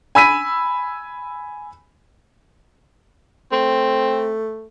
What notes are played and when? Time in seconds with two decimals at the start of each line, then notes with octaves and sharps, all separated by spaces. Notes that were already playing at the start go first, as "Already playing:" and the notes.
0.15 G#5 B5 E6 B6 D#7
3.52 A3 C4